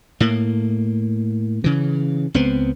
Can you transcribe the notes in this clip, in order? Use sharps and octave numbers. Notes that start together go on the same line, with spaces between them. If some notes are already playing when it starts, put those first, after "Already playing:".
A2 A#3
C#3 E3
C#2 B3 C4